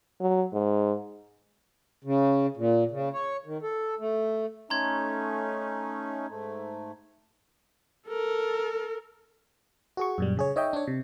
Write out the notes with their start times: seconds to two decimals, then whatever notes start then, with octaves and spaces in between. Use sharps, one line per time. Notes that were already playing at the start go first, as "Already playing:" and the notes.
0.20 F#3
0.53 G#2
2.04 C#3
2.57 A#2
2.91 C#3
3.13 C#5
3.46 D#3
3.63 A4
3.99 A3
4.70 A3 C#4 D#4 A#5 C6 G#6
6.29 G#2 A3
8.07 A4 A#4
9.97 F#4 G#4 C#6
10.18 F#2 A#2 G3
10.37 C#3 G#4 C#5
10.56 D#4 C#5 D#5 E5 G5
10.73 D4 C#5
10.87 C3